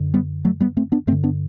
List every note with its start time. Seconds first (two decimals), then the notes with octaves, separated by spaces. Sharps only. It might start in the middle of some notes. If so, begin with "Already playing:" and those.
Already playing: F#2 D3
0.14 G3 B3
0.45 F#3 A3
0.60 G3 B3
0.77 A3 C4
0.92 B3 D4
1.07 G2 A3 C4
1.12 D3
1.23 B3 D4